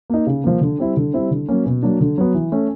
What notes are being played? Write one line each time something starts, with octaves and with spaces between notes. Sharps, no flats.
A#3 D#4
C#3
F3 A#3
D3
G3 C4 E4
D3
G3 C4 E4
D3
F#3 A#3 C#4
B2
F#3 A#3 D4
D3
F#3 B3
E3
A3 C#4